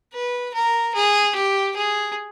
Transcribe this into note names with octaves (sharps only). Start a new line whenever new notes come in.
B4
A#4
G#4
G4
G#4